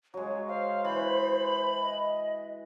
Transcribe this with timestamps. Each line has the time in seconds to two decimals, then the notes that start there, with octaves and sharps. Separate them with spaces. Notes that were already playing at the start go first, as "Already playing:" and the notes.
0.14 F#3 G#3 C#5
0.48 C5 F5
0.85 E3 B5
1.82 D#5